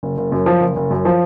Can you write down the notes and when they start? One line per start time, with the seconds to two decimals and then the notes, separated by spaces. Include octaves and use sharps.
0.03 F#1
0.18 F#1
0.32 F#2
0.46 F3
0.61 F#1
0.76 F#1
0.91 F#2
1.05 F3